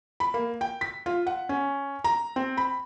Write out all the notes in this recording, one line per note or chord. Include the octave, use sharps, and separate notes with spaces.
B5
A#3
G5
B6
F4
F#5
C#4
A#5
C4
B5